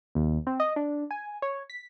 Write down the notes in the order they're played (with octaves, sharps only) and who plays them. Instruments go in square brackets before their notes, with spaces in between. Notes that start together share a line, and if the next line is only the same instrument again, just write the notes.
[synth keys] D#2
C4
D#5
D4
G#5
C#5
B6